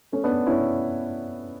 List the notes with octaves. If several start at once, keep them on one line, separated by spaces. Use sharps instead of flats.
A3 C#4
B3 D4
C#4 E4